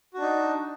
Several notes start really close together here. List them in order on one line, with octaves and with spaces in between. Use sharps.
F#4 D4 D#4